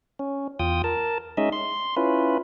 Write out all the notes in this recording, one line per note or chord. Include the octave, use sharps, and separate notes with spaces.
C#4
E2 F4 G5 D#6
A#4 A5
G#3 C#4 D#4 D#5 E5
C6
C#4 E4 F4 B4